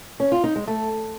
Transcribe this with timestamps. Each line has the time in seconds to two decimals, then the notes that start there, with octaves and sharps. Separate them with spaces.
0.20 C#4
0.32 F4
0.44 D#4
0.56 G#3
0.68 A3